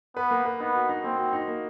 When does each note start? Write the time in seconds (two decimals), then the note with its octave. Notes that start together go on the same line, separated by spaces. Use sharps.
0.16 B3 B4
0.31 A#3
0.45 B4
0.60 B3 D#4
0.75 F#4
0.89 D#4
1.04 A#3 C4
1.19 F#4
1.33 D#4
1.48 A#3